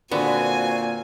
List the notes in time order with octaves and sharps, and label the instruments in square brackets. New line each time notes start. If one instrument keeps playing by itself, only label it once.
[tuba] A#2 [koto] D3 B3 [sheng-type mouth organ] C4 F#4 [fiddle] G#5